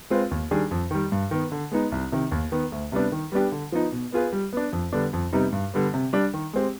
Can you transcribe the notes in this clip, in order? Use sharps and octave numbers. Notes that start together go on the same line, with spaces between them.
G#3 C4 F4 B4
D#2
D#3 G3 D4 G#4
F2
D#3 G3
G2
D#3 B3
D3
G#3 B3 D#4
C2
C3 D#3
D#2
D#3 B3
D2
C3 G3 B3 D4
D#3
G3 B3 D4 G4
D3
F3 B3 D#4
B2
B3 F4 G#4 B4
G3
B3 D4
F2
D3 G3 B3 D4
F2
C3 G3 B3 D#4
G2
D3 G3 B3
C3
G3 D4
D#3
G#3 C4 G4